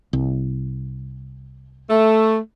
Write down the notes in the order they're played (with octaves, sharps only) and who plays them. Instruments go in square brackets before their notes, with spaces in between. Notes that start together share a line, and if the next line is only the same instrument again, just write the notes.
[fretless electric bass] C2
[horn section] A3